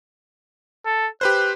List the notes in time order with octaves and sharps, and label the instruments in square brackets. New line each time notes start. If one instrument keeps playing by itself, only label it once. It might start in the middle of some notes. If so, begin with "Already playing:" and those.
[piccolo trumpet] A4
[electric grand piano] G4 B4 C5 [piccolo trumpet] F#6